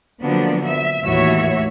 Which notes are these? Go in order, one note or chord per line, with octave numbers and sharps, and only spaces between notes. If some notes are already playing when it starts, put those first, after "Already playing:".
D3 F3 F#3 A#3 B3 D4
E5
D#2 A2 E3 F#4 C#5 E5